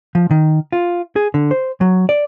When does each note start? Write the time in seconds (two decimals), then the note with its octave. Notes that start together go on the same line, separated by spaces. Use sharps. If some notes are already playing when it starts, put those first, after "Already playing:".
0.15 F3
0.31 D#3
0.72 F4
1.16 G#4
1.34 D3
1.51 C5
1.81 F#3
2.09 D5